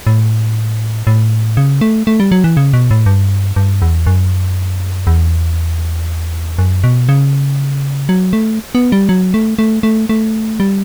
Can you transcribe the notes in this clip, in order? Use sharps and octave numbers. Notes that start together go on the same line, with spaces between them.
A2
A2
C#3
A3
A3
G3
F#3
E3
C#3
B2
A2
G2
G2
E2
F#2
E2
F#2
B2
C#3
F#3
A3
B3
G3
F#3
A3
A3
A3
A3
G3